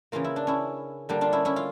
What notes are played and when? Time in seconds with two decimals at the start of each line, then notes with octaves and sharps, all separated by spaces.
0.12 C#3 E3 A#3 F4
0.24 E4
0.36 D4
0.47 C#4 E4
1.09 D3 G3 A#3 D4
1.21 D4 F4
1.32 C#4 E4
1.45 C#4 E4
1.56 F4